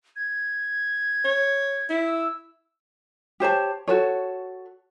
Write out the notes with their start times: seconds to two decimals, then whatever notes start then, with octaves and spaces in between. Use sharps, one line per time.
0.16 G#6
1.24 C#5
1.90 E4 B6
2.04 E6
3.40 G4 C5 C#5 A5
3.88 F#4 A4 C#5